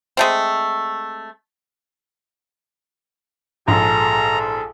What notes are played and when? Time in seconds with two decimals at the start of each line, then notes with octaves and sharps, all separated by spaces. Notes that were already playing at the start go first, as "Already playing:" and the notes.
0.17 G#3 A3 C4
3.68 A#1 G#2 G#4 A4 A#5